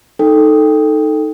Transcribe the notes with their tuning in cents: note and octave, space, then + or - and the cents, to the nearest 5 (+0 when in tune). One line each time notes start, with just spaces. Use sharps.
D#4 +0 A4 +0 G5 +15